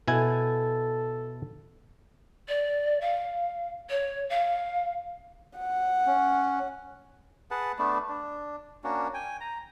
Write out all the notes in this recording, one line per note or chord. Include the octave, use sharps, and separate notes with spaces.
B2 E4 A4 G#5
D5
F5
C#5
F5
F#5
C#4
G#4 B4 F#5 A5
A3 B3 D4
D4
A#3 C#4 D4 F#4
G5 G#5
A#5